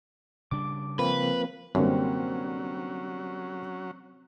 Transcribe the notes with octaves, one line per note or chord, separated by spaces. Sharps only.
C#3 G3 D4 D6
F3 A#3 C4 B4
F#2 D3 F#3 G3 A#3 C4 C#4